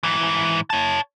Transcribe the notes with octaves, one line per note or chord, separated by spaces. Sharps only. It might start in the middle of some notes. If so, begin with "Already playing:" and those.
G#2 E3
C#5 A5